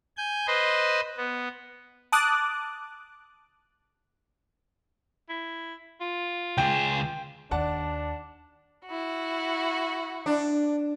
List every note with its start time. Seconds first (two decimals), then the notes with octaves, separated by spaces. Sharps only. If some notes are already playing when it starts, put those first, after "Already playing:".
0.17 G#5 G6
0.47 B4 C5 D#5 C6
1.17 B3
2.12 A5 D6 D#6 F#6
5.29 E4
6.01 F4
6.58 C#2 G#4 G5
7.51 D#2 D4 D5 F#5 A5
8.87 E4 F#4
10.26 D4